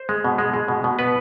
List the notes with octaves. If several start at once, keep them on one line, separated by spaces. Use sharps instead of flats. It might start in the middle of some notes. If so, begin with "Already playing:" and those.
Already playing: C5
G#3
B2
G#3
G#3
B2
B2
B3 B4